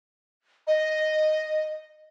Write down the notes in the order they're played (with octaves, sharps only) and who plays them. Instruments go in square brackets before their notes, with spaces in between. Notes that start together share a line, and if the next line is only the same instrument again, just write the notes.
[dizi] D#5